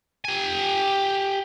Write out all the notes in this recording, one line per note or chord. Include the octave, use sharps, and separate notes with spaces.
G4 G#5